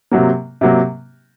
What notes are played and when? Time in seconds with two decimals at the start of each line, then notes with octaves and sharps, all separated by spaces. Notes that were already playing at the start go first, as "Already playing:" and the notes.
0.11 C3 F#3 A#3
0.61 C3 F#3 A#3